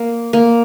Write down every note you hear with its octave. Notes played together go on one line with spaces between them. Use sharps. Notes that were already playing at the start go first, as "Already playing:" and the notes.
Already playing: A#3
A#3